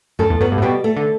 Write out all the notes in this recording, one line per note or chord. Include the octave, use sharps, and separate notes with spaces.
F#2 A3 A4
E2
F#2 B3 B4
G2
A2
B2 G3 G4
A3 A4
D3